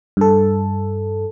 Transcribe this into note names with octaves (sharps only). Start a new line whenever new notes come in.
G2 A4